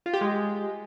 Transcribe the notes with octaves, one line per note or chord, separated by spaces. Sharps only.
F4
G4
G#3